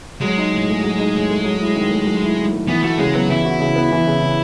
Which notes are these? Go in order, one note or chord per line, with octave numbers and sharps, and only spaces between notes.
F#3 G#3
D#4
A2
A3
F#3
D#4
A2
A3
F#3
E4
D#3
A3
F#3
E4
D#3
A3
E3 B3
A3 F#4
C#3 G#3
F#3 B3
E3 E4
F#4
C#3
B3
E3
C#3
C#3